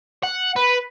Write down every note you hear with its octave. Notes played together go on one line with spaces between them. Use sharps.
F#5
B4